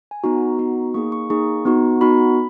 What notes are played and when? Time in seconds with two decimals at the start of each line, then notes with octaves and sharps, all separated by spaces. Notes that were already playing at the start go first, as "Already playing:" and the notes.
0.11 G#5
0.24 B3 D#4 F#4 A#5
0.59 B3 D#4 F#4
0.94 A#3 D#4 G#4 C#6
1.12 C#6
1.30 A#3 D#4 G#4 C#6
1.65 B3 D#4 F#4
2.01 B3 D#4 F#4 B5